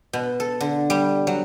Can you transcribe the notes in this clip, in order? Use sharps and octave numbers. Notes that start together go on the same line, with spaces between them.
B2
A4
D3
G3
F#3